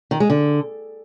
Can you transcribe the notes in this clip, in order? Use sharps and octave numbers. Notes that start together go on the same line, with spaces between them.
D#3
G#3
D3